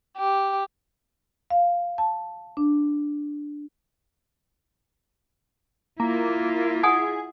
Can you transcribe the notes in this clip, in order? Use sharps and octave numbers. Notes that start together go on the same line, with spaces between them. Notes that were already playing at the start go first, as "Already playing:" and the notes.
G4
F5
A5
D4
A#3 E4 F4
G#4 F#5 G#5 D#6